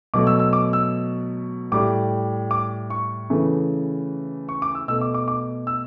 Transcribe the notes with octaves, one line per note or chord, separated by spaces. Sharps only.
B2 F#3 A3 D6
E6
E6
D6
E6
A2 G3 D6
D6
C#6
C#3 E3 A3
C#6
D6
E6
B2 A3 E6
D6
D6
D6
E6